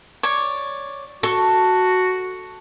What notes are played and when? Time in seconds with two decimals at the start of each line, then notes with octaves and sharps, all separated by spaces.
0.23 C#5 D5
1.23 F#4 A4 C#6